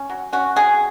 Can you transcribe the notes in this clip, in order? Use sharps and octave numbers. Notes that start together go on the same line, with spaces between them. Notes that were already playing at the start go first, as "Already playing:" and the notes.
Already playing: C#4
F#3
C#4 F#4
F#3 G#4